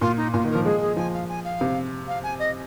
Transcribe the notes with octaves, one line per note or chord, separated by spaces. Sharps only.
A#2 F4
D#4
A#2 F4
D#3
A#4
F3
G#3 G#4
G#4
F3 G#5
F5
G#5
F5
C3
F5
G#5
D#5